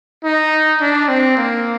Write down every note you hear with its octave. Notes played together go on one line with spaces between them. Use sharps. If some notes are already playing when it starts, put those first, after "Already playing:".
D#4
D4
C4
A#3